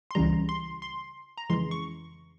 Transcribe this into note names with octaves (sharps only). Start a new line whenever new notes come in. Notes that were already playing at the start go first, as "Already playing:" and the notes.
C6
C#2 C#3 E3 G3 A#5
C6
C6
A#5
F2 C#3 E3 G#3 C6
C#6